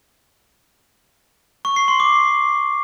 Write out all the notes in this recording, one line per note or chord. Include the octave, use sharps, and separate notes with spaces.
C#6
C7
C6
D6